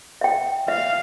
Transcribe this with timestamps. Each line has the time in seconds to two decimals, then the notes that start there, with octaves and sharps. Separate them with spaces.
0.21 E5 G5
0.68 E5 F5